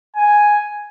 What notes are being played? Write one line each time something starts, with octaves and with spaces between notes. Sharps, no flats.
G#5